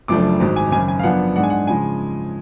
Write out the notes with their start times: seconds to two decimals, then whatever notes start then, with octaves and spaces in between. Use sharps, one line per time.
0.08 F#1 F#2 F3 A3 D4 D6
0.40 G#1 G#2 F#3
0.56 G#5
0.72 G#1 F#2 C#3 G#5
0.88 G#5
0.99 F5
1.03 F#2 F3 B3 D4 F#5
1.36 G#2 G#3 D4 F#5
1.43 G#5
1.50 F#5
1.67 C#3 F3 G#3 G#5